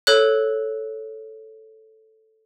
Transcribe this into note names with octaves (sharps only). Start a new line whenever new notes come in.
A4 C#5 F#6